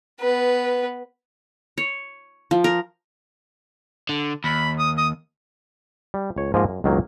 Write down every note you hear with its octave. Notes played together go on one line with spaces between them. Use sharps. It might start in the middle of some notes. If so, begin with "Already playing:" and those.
B3 B4
C#5
F3
A#4
D3
D#2 B5
D#6
D#6
G3
C#2 C#5
G#2 F3 A#3 D#5
F#2
C#2 G2 D#3 F#3 A#3